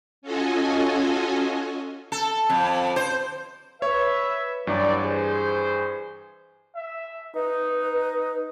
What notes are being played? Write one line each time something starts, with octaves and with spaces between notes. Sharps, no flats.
C#4 F4 F#4 A4 D#5 G#5
A4
F2
C5
B4 C#5 E5
G2 E3 F#3 D5
G#4 C5
E5
D#4 B4